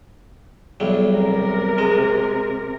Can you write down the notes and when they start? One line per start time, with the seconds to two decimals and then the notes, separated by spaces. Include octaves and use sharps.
0.80 B1 E2 G3
1.17 C3 A#4
1.78 G#3